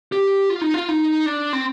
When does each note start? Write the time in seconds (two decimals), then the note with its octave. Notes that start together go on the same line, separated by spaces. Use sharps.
0.12 G4
0.50 F4
0.61 D#4
0.74 F4
0.89 D#4
1.26 D4
1.53 C4